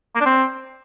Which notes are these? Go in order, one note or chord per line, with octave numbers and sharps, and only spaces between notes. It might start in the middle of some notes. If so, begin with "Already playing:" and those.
A#3
D4
C4